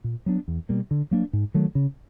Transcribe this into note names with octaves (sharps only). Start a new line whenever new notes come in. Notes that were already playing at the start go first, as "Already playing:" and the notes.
A#2
F#3 B3 D4
E2
B2 G3 A#3
D3
F#3 A#3 D4
G#2
D#3 F#3 A3
C#3